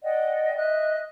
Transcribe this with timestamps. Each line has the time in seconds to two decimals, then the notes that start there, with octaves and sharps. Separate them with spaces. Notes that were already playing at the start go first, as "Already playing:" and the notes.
0.03 D5 D#5 F#5 G5
0.56 D#5 E5 F#6